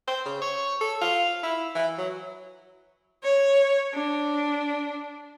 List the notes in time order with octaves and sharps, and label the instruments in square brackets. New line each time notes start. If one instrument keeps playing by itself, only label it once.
[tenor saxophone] C5
C#3
C#5
A4
F4
E4
E3
F#3
[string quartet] C#5
D4